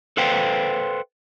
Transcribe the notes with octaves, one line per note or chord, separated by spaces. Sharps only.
A4 B4 C5 F5 G5